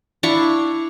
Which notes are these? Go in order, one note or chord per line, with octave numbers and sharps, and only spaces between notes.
D4 E4 F5 C#6